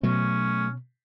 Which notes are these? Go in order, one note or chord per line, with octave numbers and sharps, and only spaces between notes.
B2 F#3 A3 C#4